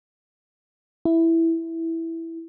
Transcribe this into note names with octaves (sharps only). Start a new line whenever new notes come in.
E4